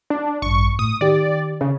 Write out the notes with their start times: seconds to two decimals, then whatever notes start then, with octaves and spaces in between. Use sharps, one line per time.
0.10 D4
0.42 A1 G2 C#6
0.79 A2 D#6
1.01 D#3 G4 D5
1.61 C#3